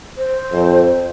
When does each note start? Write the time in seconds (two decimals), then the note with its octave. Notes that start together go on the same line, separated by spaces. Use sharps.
0.17 C5
0.52 F2